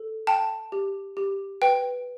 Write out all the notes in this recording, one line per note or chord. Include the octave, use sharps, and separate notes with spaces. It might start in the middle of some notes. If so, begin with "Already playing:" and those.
Already playing: A4
G5 A5
G4
G4
B4 G5